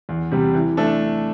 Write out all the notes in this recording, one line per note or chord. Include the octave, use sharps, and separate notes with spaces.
E2
C3 G3
E3
A3 D4 A4